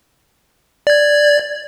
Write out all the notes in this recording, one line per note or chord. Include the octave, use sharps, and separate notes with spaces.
D5 G#6